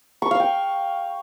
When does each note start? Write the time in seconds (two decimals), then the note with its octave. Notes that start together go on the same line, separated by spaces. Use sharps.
0.22 C#6
0.31 F5
0.40 G5